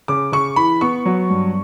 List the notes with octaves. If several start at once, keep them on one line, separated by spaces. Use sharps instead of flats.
C#3 D6
C#3 C#6
E3 B5
B3 C#6
F#3
G2